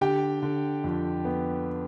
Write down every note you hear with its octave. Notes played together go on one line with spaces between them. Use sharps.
D3 G4 G5
D3
F2
B3